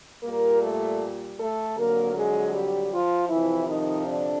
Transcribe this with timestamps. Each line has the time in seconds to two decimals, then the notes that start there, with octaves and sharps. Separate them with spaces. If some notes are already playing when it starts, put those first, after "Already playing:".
0.23 A#2 G3 A#3 A#4
0.62 A3 A4
1.38 A3 A4
1.76 F2 D3 F#3 A#3 A#4
2.15 G#3 G#4
2.53 G3 G4
2.91 F3 F4
3.29 F2 C3 E3 F3 E4
3.67 D#3 D#4
4.06 D3 D4